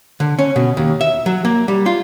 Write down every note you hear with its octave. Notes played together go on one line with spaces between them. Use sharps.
D3
C#4
B2
D#2
E5
F#3
A#3
G3
F4